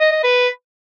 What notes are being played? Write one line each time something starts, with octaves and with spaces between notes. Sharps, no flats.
D#5
D#5
B4